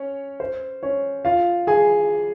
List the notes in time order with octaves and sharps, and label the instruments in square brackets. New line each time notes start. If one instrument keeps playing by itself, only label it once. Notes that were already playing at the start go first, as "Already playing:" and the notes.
Already playing: [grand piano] C#4 C#5
C5
C#4 C#5
F4 F5
G#4 G#5